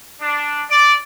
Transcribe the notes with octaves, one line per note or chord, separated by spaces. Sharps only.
D4
D5